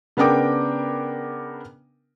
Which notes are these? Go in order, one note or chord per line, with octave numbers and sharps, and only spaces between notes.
C#3 B3 D4 A#4 G5 D6